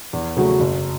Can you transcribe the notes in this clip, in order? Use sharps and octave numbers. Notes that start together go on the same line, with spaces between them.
E2
C#3 F#3 A3 F#4
F#1